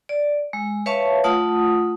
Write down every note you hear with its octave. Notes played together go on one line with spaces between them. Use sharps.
D5
G#3
B4 C#5 E5 F5 A5 C#6
A3 F4 F#5 A5 D#6